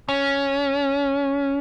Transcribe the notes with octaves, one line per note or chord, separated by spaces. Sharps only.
C#4